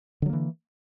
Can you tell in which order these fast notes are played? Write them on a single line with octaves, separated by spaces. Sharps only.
D3 F#3 A#3 E3